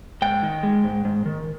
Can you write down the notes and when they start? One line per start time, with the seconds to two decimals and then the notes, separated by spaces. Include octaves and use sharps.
0.22 G#2 G5
0.43 D#3
0.63 G#3
0.84 G#2
1.05 G#2
1.26 D#3